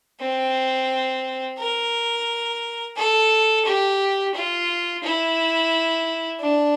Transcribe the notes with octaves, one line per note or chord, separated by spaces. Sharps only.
C4
A#4
A4
G4
F4
E4
D4